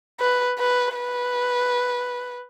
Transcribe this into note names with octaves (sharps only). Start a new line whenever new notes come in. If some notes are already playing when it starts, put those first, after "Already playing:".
B4
B4
B4